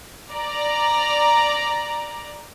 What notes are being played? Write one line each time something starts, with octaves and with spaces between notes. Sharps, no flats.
D5 A#5